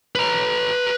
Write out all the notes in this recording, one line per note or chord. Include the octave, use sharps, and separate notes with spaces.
B4 A#5